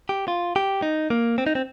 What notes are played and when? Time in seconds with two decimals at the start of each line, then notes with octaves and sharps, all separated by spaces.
0.09 G4
0.28 F4
0.56 G4
0.82 D#4
1.10 A#3
1.38 C4
1.47 D#4
1.55 C4